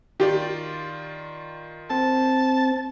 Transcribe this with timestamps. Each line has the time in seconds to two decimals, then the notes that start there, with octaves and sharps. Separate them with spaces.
0.20 D#3 F4 G4 D5
1.90 C4 A5